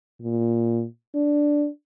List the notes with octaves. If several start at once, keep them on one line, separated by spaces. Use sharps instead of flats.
A#2
D4